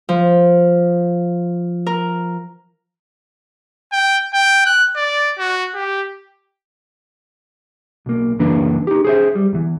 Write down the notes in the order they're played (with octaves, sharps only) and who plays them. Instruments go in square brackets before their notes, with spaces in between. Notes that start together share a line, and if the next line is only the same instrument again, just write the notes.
[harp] F3
A#4
[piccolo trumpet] G5
G5
F#6
D5
F#4
G4
[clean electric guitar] B1 A#3
C#2 F#2 E3 A#3 D4 B4
D#4 G4
G#4 C5 E5
G3
E2 E3